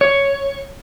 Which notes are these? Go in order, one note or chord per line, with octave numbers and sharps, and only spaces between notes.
C#5